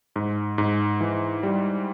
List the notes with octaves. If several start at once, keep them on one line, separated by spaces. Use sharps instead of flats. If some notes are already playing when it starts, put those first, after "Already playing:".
G#2
G#2
E3
G3